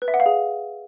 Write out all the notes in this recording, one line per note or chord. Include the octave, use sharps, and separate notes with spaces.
B4
E5
F#5
F5
G#4